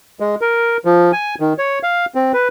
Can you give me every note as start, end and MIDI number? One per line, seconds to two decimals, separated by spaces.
0.20 0.35 56
0.41 0.77 70
0.85 1.11 53
1.13 1.35 80
1.40 1.53 51
1.58 1.79 73
1.83 2.06 77
2.15 2.32 60
2.33 2.48 71